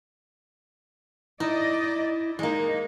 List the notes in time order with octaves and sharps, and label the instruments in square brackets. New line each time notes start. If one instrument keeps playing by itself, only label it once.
[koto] D#4 [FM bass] E4 [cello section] D5 D#5
[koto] G#3 A#3 [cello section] D#4